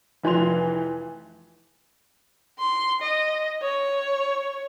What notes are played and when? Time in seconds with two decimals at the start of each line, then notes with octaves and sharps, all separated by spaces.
0.24 F1 E3 F3 C6 F7
2.59 C6
3.02 D#5
3.62 C#5